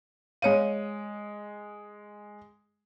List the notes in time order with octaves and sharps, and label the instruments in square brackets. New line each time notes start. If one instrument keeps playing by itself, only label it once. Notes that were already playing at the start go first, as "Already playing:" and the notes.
[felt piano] G#3 D#7 [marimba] C#5 F5